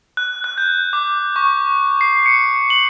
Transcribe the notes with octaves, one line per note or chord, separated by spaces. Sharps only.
F#6
F#6
G6
D6
C#6
C7
C#7
F#7